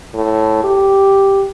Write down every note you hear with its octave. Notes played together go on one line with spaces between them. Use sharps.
A2
G4